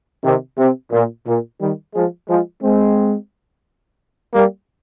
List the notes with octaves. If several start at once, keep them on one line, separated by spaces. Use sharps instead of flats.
C3 D#3
C3
A#2
A#2
D#3 G3
F3 G#3
F3 G#3
G#3 C4
G3 A#3